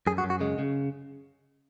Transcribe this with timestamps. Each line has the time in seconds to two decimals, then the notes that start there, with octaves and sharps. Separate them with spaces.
0.07 F#2 G#4
0.18 F#4
0.24 F#2
0.30 F#4
0.40 C#3 G#3
0.59 C#3